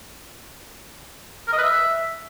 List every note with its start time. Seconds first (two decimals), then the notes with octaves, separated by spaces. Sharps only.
1.48 A#4
1.53 D#5
1.58 B4
1.63 E5